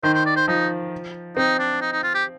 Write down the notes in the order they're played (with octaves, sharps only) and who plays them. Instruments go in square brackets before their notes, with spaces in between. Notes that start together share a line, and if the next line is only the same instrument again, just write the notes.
[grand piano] D#3 [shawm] C5
[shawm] C5
D5
C5
[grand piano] F3 [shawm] D#4
[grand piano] C4 [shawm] D#4
[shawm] D4
D#4
D#4
F4
G4